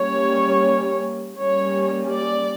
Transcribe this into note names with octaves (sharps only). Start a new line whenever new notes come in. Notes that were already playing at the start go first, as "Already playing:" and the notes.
Already playing: G3 A#3 C#4 C#5
G3 A#3 C#4 C#5
D5